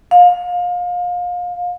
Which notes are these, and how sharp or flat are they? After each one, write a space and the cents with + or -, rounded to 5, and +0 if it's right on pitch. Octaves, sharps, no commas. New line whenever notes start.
F5 +30